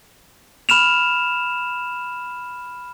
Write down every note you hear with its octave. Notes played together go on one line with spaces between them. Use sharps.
B5 F6 E7 F7